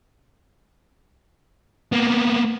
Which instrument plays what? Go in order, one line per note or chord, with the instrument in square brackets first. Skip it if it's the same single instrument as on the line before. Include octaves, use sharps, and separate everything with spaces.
[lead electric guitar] A#3 B3